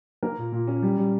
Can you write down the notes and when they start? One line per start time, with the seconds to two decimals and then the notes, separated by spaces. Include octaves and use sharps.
0.23 A#3 A#4
0.38 A#2
0.52 A#2
0.68 C#4
0.82 G3
0.98 G3